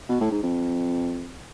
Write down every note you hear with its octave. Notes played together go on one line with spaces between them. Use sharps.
B2
A2
G#2
F2